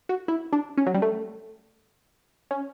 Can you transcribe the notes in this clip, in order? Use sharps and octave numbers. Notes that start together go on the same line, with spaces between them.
F#4
E4
D4
C#4
F#3
G3
A3
C#4